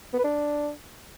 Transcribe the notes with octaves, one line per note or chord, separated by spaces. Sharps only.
B3
B4
D4